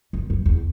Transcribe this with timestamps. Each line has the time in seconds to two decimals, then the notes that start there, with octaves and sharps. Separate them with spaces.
0.13 F#2
0.30 F#2
0.46 E2